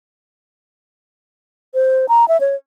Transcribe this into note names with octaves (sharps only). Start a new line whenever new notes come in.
C5
A#5
E5
C#5